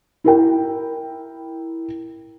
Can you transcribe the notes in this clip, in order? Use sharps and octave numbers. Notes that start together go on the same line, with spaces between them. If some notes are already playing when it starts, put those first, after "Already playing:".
E4 A#4 G5